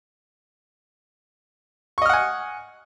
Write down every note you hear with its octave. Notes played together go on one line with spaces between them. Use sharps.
D#5 F#5 G#5 C#6 F6